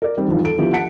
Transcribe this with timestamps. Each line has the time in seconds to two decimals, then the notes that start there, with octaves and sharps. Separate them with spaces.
0.02 A#4 D5
0.17 D#3 G3 C4
0.28 E2 G#2 D#3 F3
0.44 A4 D7
0.58 D3 F3 B3 E4 G4
0.73 F#5 A5 B6 C#7 D7